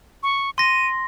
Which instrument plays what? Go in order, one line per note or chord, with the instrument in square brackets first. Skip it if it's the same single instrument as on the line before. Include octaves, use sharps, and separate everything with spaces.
[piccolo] C#6
[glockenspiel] C6 A#6 [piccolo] D#7